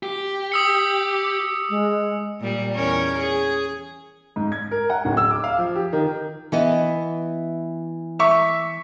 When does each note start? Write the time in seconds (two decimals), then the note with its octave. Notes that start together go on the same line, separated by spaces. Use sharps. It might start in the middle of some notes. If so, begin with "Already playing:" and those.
0.03 G4
0.52 D#6 E6 C#7
1.70 G#3
2.40 A#2 G3
2.74 E2 C#4 A#4
3.18 G#4
4.36 G#2
4.52 G#6
4.71 A#4
4.90 F#5
5.05 D1
5.17 E6
5.31 D6
5.44 F5
5.58 F3
5.75 G4
5.93 D#3
6.52 E3 B3 D#5
8.19 E5 C#6